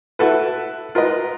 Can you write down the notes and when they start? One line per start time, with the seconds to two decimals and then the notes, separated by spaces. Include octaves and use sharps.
0.19 E4 F#4 A4 B4
0.95 F4 A#4 B4 D#5